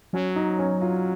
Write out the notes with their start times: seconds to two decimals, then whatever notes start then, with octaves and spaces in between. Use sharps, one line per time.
0.13 F#3 C#4
0.36 D#4
0.59 C#4
0.81 F4